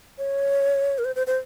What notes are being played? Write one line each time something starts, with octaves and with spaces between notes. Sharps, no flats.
C#5
A#4
C5
C5
C5